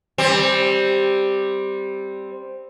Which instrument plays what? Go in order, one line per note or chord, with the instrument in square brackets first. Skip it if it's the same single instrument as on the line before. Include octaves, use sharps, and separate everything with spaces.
[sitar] G3 C4